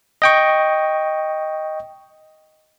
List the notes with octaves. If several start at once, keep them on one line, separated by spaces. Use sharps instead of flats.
D#5 G5 C#6